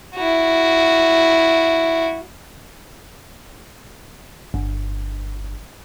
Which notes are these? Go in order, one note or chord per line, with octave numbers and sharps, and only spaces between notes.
E4 F#4
G1